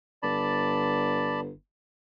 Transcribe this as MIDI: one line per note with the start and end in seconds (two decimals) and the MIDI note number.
0.23 1.51 31
0.23 1.40 74
0.23 1.40 81
0.23 1.40 83